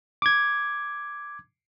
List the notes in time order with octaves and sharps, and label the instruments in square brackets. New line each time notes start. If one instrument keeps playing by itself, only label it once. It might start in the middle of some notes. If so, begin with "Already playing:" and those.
[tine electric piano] D6 G#6